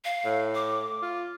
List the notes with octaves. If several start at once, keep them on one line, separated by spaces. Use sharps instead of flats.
F5
A2
D6
F4